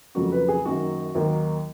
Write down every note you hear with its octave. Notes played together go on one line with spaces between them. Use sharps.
F2 C#3 F#3 A#3 F#4
B4
G#4
F#2 D#3 A#3 F#4
D#2 D#3 F#3 A#3